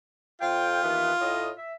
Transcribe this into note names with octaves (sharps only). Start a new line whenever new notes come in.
F2 F4 G5
D#2 E3 B3
A2 D#5
E5